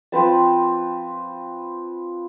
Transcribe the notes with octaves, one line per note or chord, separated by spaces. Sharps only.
F3 C4 B4 A5